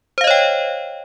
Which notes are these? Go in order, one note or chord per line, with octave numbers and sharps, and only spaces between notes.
C5 C#5 D#5 F5 G5